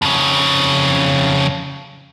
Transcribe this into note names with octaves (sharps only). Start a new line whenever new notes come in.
F2 C#3